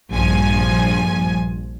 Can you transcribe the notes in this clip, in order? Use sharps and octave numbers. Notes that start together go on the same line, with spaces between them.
A#1 G2 F3 G#5